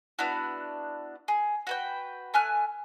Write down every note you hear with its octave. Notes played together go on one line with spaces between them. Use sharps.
B3 D4 E4 F#4
G#4
F#4 B4 G5
A3 G#5 F6 F#6